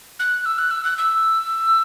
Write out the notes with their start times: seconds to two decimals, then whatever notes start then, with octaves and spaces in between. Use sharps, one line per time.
0.19 F#6
0.46 E6
0.58 F#6
0.71 E6
0.85 F#6
0.98 E6